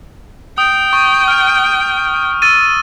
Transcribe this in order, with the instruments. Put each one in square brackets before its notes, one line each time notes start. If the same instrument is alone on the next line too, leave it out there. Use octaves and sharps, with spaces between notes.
[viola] G5 [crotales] D#6
[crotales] C#6
F6
E6 A6 D#7